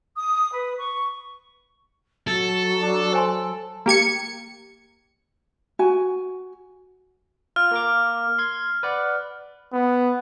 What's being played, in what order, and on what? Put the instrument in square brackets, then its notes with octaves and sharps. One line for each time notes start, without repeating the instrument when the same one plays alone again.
[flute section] D#6
B4
C#6
[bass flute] F#3 [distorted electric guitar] A4
[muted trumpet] D4
[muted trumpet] A4 [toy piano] C5 G#5 C6
[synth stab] A#3 G4 G#6 C#7
[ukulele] F#4 G#5
[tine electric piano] F4 [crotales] F6
[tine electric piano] A#3 A#5 D6
C6 G#6
B4 D5 F#5
[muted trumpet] B3